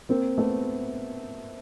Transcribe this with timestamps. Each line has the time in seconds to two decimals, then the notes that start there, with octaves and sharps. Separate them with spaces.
0.09 A#3 C4
0.38 A3 B3